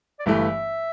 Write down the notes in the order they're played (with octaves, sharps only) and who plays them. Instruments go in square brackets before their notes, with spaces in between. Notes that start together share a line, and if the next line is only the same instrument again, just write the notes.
[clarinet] D5
[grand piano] G1 G2 E3 A3 [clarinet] E5